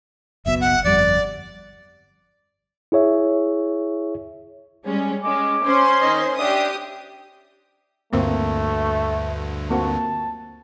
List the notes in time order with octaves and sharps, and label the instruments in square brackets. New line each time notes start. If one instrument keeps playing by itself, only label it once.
[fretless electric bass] F#1 B1 B2 [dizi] E5
[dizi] F#5
[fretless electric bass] G1 F2 G3 [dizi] D5
[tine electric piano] E4 G#4 C#5 E5
[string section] G3 G#3 C#4
[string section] G#3 C#4 [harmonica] D6
[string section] C#4 C5 C6
[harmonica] D#3 D#5
[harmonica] D4 E5 [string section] G4 D#6
[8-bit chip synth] D2 G2 D3 [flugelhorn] A3 [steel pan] A#3 C4
[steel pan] A#3 C4 F#4 [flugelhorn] A5